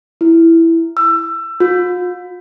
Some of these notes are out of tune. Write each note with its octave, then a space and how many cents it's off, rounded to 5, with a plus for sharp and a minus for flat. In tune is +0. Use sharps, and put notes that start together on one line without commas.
E4 +5
E6 +25
F4 +45